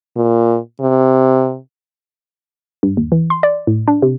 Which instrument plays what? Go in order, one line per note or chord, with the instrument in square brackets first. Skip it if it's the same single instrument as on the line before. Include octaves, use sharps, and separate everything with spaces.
[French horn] A#2
C3
[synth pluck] G2
D#2
E3
C6
D5
A2
D4
C3